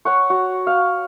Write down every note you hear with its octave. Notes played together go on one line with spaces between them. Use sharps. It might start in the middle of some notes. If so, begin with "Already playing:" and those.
C#5 F#5 C#6
F#4
F5